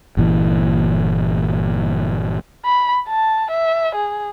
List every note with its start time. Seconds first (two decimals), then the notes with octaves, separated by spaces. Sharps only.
0.17 G1 A#2 E3
2.65 B5
3.08 A5
3.50 E5
3.95 G#4